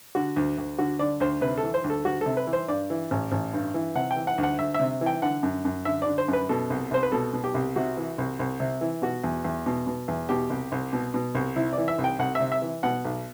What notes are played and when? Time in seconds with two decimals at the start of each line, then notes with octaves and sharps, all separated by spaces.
0.15 D3 F#4
0.36 D2
0.58 D2
0.78 D3 F#4
0.99 D3 D5
1.20 D2 C5
1.41 C3 B4
1.58 E3 A4
1.74 C5
1.84 D2
1.90 A4
2.05 D2 F#4
2.21 C3 A4
2.37 B4
2.47 E3
2.53 C5
2.68 G2 D5
2.90 E3
3.11 A1
3.32 A1
3.53 G2
3.74 E3
3.95 C3 F#5
4.11 G5
4.16 E3
4.27 F#5
4.38 D2
4.43 F#5
4.59 D2 E5
4.74 E5
4.80 C3
5.01 E3
5.06 G5
5.22 D3 F#5
5.43 F#2
5.65 F#2
5.85 D3 E5
6.02 D3 D5
6.18 C5
6.28 F#2
6.33 B4
6.49 B2 A4
6.70 C2
6.91 C2 C5
7.03 B4
7.12 B2 A4
7.33 B2
7.44 G4
7.54 C2
7.76 C3 F#4
7.97 E3
8.18 C2
8.39 C2
8.60 C3
8.81 E3
9.02 B2 F#4
9.24 E2
9.44 E2
9.66 B2
9.87 B2
10.08 E2
10.29 B2 G4
10.50 C2
10.72 C2
10.93 B2
11.14 B2
11.35 C2
11.56 C3 E4
11.73 D5
11.78 E3
11.88 E5
11.98 C2
12.04 G5
12.19 C2 F#5
12.35 E5
12.40 C3
12.52 E5
12.62 E3
12.83 B2 F#5
13.05 B1